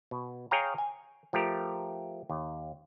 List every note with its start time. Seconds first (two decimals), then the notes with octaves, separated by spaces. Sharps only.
0.11 B2
0.51 G#4 C#5 F5 G5 G#5 A#5
0.78 G#5
1.33 F3 A3 G4 A#4
2.29 D#2